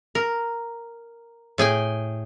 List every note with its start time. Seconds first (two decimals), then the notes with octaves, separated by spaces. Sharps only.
0.15 A#4
1.58 A2 G#4 G5 G#5